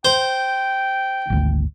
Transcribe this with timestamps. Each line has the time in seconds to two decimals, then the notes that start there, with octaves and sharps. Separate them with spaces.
0.05 C5 G5
1.30 G#1 D2